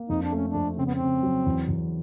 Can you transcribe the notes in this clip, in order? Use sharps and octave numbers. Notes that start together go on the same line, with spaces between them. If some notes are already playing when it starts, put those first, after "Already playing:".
Already playing: A#3
F2 D#4
D4
A3 C#4
D4
F2
C#3 C4
B3
C4
C#3
F#3
E2
E2